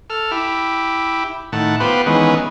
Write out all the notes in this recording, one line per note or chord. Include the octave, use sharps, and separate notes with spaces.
A4 F6
E4 G4
A2 D#3 F#5 A5
B3 F4 G4 B4 C5
D#3 E3 G#3 B3 C#4